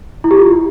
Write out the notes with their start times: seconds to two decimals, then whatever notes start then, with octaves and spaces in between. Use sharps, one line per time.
0.24 E4
0.31 G4
0.37 F4